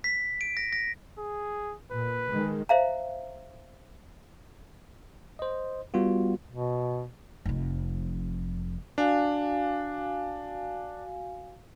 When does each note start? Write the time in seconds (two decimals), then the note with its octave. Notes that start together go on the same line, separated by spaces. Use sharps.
0.04 B6
0.41 D7
0.57 A#6
0.73 A#6
1.18 G#4
1.92 A#2 B4
2.32 D#3 G#3
2.69 C5 E5 F5 A#5
5.39 C5 D#5
5.94 G3 B3 F4 F#4
6.50 B2
7.46 F1 F2
8.98 D4 F#4 F5 G#5